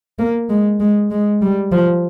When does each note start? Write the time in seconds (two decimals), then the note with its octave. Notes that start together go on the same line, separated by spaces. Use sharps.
0.19 A#3
0.50 G#3
0.80 G#3
1.11 G#3
1.42 G3
1.72 F3